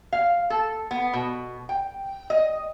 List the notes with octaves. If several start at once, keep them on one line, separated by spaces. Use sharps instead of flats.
F5
A4
B3
B2
G5
D#5